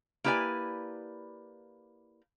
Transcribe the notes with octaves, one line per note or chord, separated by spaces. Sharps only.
A#3 E4 G4 B4 D5 G#5